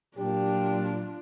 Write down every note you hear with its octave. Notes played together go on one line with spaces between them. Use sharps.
A#2 F#3 D4 F4 G4